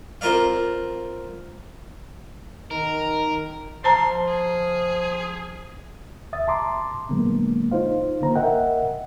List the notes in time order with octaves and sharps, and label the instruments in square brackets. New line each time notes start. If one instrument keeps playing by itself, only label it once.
[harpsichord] C4 F4 A#4 D5 F5
[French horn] D#3 [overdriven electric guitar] A#4
[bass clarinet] F3 [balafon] C5 A5 A#5 [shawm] C6
[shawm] G#4
[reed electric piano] D2 E5 D#6 A6
A5 A#5 C6 D6
A#2 D3 F#3 G#3 A#3 B3
D#4 F4 C5 F5
D3 A#3 C5 A#5
A#4 D#5 E5 F#5 G5